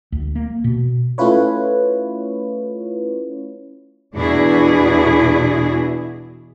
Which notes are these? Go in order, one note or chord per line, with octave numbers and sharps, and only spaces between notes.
D2
A#3
B2
A3 C#4 E4 F4 B4 C#5
E2 B2 D4 E4 F#4 G#4